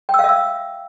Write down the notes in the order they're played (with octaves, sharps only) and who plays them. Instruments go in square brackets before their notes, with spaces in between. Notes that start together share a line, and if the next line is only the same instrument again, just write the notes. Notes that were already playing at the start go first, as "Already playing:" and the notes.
[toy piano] G5
E6
F5
E5
E6